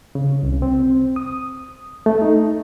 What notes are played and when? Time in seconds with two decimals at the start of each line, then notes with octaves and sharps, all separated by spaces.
0.15 C#3
0.43 C2
0.62 C4
1.16 D#6
2.06 A3
2.22 D#4